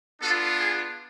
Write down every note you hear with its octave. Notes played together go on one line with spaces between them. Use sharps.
B3 D4 F4 A4
G#4